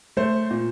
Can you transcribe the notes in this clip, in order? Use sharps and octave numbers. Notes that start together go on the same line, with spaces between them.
A3 C5
A#2